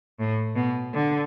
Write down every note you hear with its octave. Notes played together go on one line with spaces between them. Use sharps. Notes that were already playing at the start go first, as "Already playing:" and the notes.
A2
B2
D3